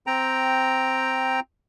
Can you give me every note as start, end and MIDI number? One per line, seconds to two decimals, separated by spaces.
0.07 1.40 60
0.07 1.40 79
0.07 1.40 82